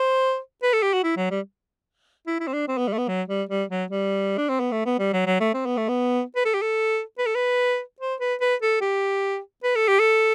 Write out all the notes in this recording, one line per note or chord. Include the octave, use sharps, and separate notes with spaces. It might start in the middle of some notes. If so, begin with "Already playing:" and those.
Already playing: C5
B4
A4
G4
F#4
E4
F#3
G3
E4
E4
C4
D4
C4
B3
G3
A3
B3
F#3
G3
G3
F#3
G3
D4
C4
B3
A3
B3
G3
F#3
F#3
A3
C4
B3
A3
B3
B4
A4
G4
A4
B4
A4
B4
C5
B4
B4
A4
G4
B4
A4
G4
A4